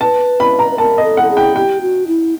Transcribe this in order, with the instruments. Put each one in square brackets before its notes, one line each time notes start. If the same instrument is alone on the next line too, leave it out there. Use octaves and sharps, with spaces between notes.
[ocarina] B4 [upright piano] A5
[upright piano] B5
A#5
[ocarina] B4
[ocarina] A#4 [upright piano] A5
[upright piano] D#5
[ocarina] A4
[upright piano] F#5
[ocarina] A4
G#4
[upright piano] G5
[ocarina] G4 [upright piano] G5
[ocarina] F#4
E4